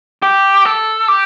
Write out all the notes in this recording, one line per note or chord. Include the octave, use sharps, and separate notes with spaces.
G4
A4
G4